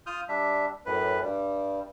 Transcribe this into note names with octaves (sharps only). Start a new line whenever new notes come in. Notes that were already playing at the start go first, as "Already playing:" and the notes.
F4 D#6 F6 G6
G3 D4 E5
F#2 A2 B4
G2 G3